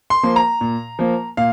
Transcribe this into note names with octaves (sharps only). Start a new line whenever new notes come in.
C6
F3 A#3
A#5
A#2
F3 A#3
A#2 F5